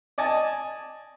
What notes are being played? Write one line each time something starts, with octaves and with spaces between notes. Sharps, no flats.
D5 D#5 G#5 A5